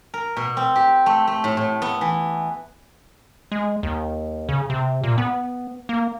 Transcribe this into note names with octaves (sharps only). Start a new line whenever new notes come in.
A#4
B2
C4
G4
A3
A3
A2
A2
B3
E3
G#3
D#2
C#3
C3
A#2
B3
A#3